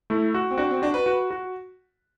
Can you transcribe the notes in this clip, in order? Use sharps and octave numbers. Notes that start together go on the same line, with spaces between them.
A3 E4
F#4
C4
D4 F#4
C4
D4 F#4
B4
F#4
F#4